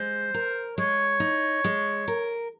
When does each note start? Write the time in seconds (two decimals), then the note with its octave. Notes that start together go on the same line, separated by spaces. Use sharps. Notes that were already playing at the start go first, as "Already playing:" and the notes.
Already playing: G#3 C5
0.34 A#4
0.77 G#3 C#5
1.20 D#4
1.64 G#3
2.08 A#4